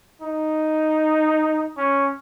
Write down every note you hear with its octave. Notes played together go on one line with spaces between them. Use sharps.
D#4
C#4